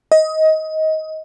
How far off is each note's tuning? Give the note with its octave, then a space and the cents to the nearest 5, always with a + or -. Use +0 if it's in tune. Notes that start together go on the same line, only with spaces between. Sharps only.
D#5 +20